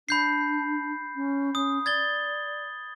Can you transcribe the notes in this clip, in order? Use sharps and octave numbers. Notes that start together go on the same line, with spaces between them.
D4 B5 G6 C7
C#4
C#4 D#6
D5 G#6 A6 G7